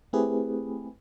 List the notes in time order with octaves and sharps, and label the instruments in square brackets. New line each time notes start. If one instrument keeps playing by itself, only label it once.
[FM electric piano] A3 C4 E4 G4 G#4 B4